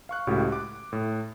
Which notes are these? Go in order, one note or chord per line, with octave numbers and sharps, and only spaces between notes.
F5 C#6 F#6
C#2 A2 F#4 G4 F#5
D6 F#6
A2